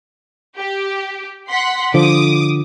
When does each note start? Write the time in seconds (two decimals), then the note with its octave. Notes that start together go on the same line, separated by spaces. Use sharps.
0.57 G4
1.48 F#5 C6 B6
1.94 D3 F3 D6 D#6